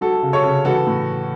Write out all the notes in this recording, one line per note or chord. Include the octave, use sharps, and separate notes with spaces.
F#3 F#4 A4
C#3
A4 C#5
C#3
E3 F#4 A4
A2